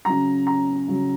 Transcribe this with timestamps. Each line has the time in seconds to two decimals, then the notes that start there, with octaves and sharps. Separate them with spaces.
0.05 C#3 F#3 A#5
0.47 A#5
0.88 C#3 F#3